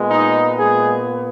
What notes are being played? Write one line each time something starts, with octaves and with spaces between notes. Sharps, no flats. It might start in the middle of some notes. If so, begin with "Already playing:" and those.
Already playing: A#2 G#3 B3
D#4
G#3 G#4